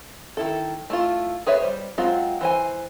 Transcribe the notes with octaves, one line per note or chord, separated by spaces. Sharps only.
D#3 E4 A4
A3 E4 F4
G#4 B4 C#5 E5
G3 C5
F#3 G#3 C4 F4
E3 C5 G#5